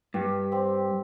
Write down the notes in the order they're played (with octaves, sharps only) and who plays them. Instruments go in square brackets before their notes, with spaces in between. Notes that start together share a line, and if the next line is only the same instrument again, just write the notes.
[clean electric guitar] G2 [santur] G4
[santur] C4